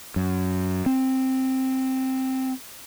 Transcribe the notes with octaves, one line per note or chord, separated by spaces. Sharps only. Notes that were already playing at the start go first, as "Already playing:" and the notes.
F#2
C4